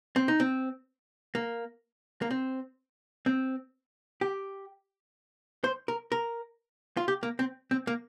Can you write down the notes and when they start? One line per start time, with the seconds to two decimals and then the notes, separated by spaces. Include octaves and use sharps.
0.16 C4
0.28 D#4
0.40 C4
1.35 A#3
2.22 A#3
2.31 C4
3.26 C4
4.21 G4
5.64 C5
5.88 A#4
6.12 A#4
6.97 F4
7.08 G4
7.23 A#3
7.39 C4
7.71 C4
7.87 A#3